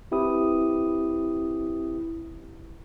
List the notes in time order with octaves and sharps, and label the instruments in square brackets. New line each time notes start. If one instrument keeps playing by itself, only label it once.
[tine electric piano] C4 E4 G4 B4 D#6